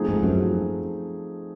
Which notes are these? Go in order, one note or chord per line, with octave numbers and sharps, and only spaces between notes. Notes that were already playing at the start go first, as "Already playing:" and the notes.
Already playing: F3 A3 C4 D#4 G#4
G#2
F#2